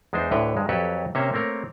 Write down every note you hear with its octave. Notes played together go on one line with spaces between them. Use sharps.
E2 G#3 D4 D#4 C5
D2 A2 D3 B4 C#5 G5
G2 G#3
F2 F#3 G4 A4 B4 C#5
C3 A#3 C#4 C5 C#5 E5
A3 A#3 C4 A#4 C#5